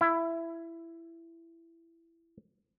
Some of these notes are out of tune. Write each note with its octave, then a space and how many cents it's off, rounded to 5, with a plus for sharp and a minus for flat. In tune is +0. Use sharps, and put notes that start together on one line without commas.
E4 +15